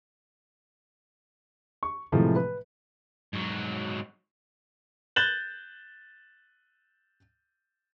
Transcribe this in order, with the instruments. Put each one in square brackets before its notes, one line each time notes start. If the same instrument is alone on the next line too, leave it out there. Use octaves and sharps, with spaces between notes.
[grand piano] C#6
A2 C3 E3 F3 G#3 A3
B4
[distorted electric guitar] G#2 F#3
[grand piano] F#6 G6 A6 E7 F#7 G7